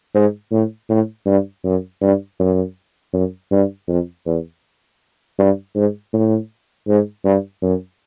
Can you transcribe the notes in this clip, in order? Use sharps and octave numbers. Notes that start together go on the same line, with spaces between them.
G#2
A2
A2
G2
F#2
G2
F#2
F#2
G2
F2
E2
G2
G#2
A2
G#2
G2
F#2